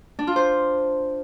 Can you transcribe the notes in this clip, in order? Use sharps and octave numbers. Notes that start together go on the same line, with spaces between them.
D4
F4
C5